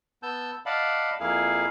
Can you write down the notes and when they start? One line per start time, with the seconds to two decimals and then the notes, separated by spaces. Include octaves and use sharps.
0.23 B3 A5 E6 G6
0.66 D5 D#5 F5 F#5 A5 B5
1.20 F2 A#3 E4 G#4 F5